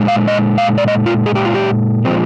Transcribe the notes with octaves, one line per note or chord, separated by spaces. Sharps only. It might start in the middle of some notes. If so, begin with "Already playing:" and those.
Already playing: A#2 G#3
F5
D#5
F5
D5
D#5
F4
G#4
G4
F4
G4
A#2 F3 G#3 C4